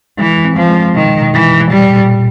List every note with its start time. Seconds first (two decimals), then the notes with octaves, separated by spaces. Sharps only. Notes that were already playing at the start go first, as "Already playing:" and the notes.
0.18 E3 G#3
0.44 C4
0.56 F3
0.69 G#3
0.95 B2 D#3
1.21 B2
1.34 E3
1.46 B2
1.70 A#2 G3
1.96 A#2